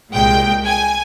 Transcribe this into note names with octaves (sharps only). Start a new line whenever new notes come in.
C2 A#2 G#3 G5
G#5